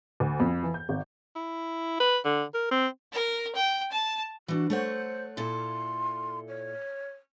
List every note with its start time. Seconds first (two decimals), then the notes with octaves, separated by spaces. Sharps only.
0.20 D2
0.40 F2
0.63 E3
0.74 G6
0.89 G#1
1.36 E4
2.00 B4
2.25 D3
2.54 A#4
2.71 C4
3.12 A#4
3.55 G5
3.92 A5
4.48 E3 D4 F#4
4.70 A3 C5 C#5 F#5
5.37 A#2 E4 A4 C6
6.48 C#5